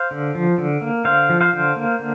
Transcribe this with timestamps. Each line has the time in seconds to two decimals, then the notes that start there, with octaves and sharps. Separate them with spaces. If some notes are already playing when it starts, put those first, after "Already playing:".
Already playing: C5 F5
0.11 D3
0.35 F3
0.58 D3
0.81 A#3
1.05 D3 C5 F5
1.30 F3
1.41 C5 F5
1.53 D3
1.76 A#3
1.99 D3